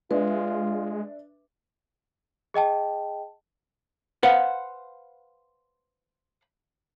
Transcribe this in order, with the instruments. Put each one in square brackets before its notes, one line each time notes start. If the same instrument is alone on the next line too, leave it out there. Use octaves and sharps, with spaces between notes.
[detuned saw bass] G#3 [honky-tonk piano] D4 E5 [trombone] F4 [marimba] B4
[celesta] G#4 D#5 G5 A5
[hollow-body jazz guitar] B4 C5 F5 F#5